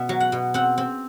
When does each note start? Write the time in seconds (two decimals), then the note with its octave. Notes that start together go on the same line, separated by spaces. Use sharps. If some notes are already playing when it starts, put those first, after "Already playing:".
Already playing: B2 E5
0.09 F#3
0.20 F#5
0.32 B2
0.54 C4 F#5
0.78 C4